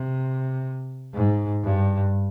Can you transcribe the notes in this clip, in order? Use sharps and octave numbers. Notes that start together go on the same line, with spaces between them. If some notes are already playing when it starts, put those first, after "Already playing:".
Already playing: C3
G#2
G2